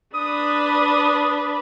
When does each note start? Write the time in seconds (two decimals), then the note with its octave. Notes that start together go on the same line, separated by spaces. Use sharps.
0.14 D4 B4 D#6